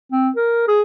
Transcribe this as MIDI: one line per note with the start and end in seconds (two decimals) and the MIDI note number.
0.12 0.29 60
0.36 0.63 70
0.68 0.82 68